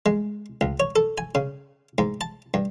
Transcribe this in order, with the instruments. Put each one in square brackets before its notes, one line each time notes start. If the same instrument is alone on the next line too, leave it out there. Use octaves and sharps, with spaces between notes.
[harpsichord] G#3
C#2
C#5
A4
G#5
C#3
G#2
A5
G2